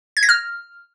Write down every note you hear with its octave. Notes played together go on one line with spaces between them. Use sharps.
G#6
A#6
F6